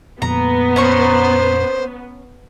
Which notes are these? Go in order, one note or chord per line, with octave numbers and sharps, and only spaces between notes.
F2 A#2 A#3 B3 A#5
C#4 C5 A#5 C#6